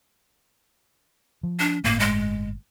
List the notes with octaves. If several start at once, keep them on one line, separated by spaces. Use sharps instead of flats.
F3
D4
G1 A2 A3 A#3
G#3